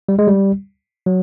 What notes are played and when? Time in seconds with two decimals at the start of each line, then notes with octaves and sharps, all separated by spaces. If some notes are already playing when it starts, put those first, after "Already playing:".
0.09 G3
0.19 G#3
0.28 G3
1.06 F#3